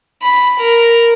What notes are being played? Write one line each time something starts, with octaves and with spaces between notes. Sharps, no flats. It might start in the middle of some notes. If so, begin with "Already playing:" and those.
B5
A#4